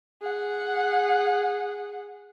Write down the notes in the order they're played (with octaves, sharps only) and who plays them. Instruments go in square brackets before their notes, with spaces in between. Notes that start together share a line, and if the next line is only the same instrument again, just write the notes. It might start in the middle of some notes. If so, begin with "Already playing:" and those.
[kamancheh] G#4 F#5